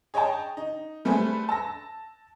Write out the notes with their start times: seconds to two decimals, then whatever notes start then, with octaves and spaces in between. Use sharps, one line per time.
0.14 G#4 C#5 D#5 G5 A5
0.57 D#4
1.05 G3 A3 G#4 A4 B4 C5
1.49 A5 E6 A#6